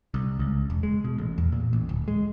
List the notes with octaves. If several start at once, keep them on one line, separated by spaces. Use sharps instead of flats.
C2
C#2
E1
G#3
B2
A1
E2
A#2
A1
D1
G#3